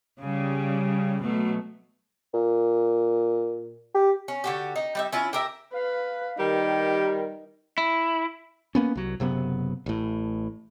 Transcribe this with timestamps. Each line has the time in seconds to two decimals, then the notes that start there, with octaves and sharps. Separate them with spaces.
0.21 C#3 G3
1.22 B2 F#3 A3
2.34 A#2
3.95 G4
4.28 C#4
4.44 D3 F#4 G4
4.76 D#4
4.95 G3 D#4 E5
5.12 C#4 E4 F4
5.33 G4 A#4 E5
5.73 B4 F5
6.39 D#3 G3 G4 A#4
7.78 E4
8.75 A#3 B3 C#4
8.95 C2 F#3
9.20 F#1 C3 F#3 B3
9.86 A1 A2